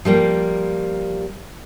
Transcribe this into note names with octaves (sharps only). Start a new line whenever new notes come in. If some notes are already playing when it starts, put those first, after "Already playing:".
F3 G3 A#3